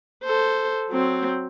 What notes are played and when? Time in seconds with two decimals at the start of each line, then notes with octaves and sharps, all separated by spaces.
0.24 A4 C5
0.91 F#3 C4